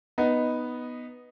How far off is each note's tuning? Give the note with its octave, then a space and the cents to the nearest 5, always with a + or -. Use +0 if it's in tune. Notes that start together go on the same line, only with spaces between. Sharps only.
B3 +0 D#4 +0